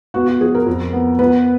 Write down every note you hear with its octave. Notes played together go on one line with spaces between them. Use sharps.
B3 F#4
F#4
F3 G#4
A#4
F2
B3
B3 B4